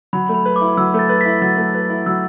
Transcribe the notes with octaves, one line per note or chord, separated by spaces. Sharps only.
F#3 B5
A3
B5
B4
D6
E4
F#3 E6
A3
A6
B4 A6
E4 B6
F#3 A6
A3
B4
E4
F#3 E6